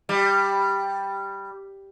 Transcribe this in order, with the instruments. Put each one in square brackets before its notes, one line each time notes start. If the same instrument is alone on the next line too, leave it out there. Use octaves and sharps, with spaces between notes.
[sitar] G3